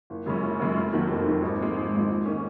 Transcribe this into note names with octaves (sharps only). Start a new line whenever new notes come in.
F#1
F#2 C#3 G#3 C#4
F#1
F#2 C#3 G#3 C#4
F1
D#2 D#3 F#3 A#3
F1
D#2 D#3 F#3 A#3
G#1
G#2 F3 G#3
G#1
G#2 F3 G#3
G#2
D#3 A#3 C#4